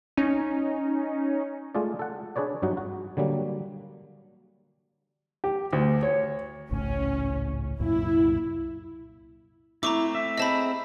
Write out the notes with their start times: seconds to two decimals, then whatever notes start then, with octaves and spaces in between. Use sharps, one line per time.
0.17 C#4 D#4
1.75 G#3 A3 F4 G#4 D5
1.99 A4 F#5
2.36 D4 G#4 B4 C#5 D5
2.62 G2 F#3 D#4 F#4
2.77 F#4
3.17 D3 F#3 G3 A#3
5.44 G4
5.73 D2
6.03 C#5
6.71 G#1 C#2 A2 C#4
7.80 C2 F#2 A#2 E4
9.83 A3 C4 E4 A#5 C#6 D6
10.15 E5
10.37 C4 G#4 D#5 A5 B5